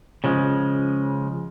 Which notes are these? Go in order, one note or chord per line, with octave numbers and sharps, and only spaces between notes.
C#3 F3 G#3